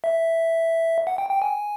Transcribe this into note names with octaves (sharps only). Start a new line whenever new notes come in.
E5
F#5
G5
G5
G#5